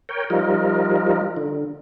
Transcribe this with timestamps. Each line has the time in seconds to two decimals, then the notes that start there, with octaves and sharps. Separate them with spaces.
0.09 A#4 C#5 G5
0.30 F3 G3 D#4 F4 A#4
1.36 D3